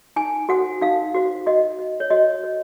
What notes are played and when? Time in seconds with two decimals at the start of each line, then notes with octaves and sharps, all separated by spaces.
0.16 D#4 G#5
0.49 F#4 C5 F#5
0.81 D#4 F5
1.15 F#4 C5
1.46 F#4 D#5
1.79 C5
2.00 C#5
2.11 F#4 D#5
2.44 C5